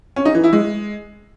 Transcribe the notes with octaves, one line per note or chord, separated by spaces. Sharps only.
C#4
D#4
E3
E4
G#3